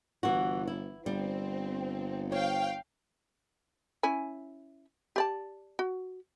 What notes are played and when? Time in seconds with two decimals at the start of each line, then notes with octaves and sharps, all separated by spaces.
0.23 G1 E3 F#4
0.67 E4
1.06 G1 G3 C4
2.32 C5 C#5 F5 G5
4.03 C#4 E4 G#5
5.16 G4 D5 A5
5.79 F#4